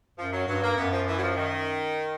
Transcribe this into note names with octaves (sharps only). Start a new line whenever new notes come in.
F#2 F3
F#3
G2 F#3
A#3
F#2 B3
F3
E3
F#3
F3
D#3